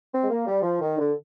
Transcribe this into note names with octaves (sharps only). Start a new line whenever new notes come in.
C4
G#3
A#3
G3
F3
D#3
D3